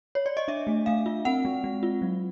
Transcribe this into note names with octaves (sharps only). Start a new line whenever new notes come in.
C#5
D5
D#5
D4 E5
A3
A3 F5
F4
C4 F#5
G#3
G#3
F4
F#3